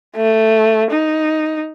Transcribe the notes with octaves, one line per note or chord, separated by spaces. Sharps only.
A3
D#4